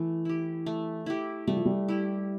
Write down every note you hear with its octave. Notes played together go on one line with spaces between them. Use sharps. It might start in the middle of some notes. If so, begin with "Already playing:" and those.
Already playing: E3 A3
E4 G4
A3
E4 G4
G3 A3
F3
G3
E4 G4